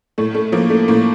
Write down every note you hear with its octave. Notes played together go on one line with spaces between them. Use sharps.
A2 A3
A3
F3 A#3
A3
A2 A#3